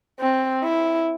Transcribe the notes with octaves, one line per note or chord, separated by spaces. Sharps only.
C4
E4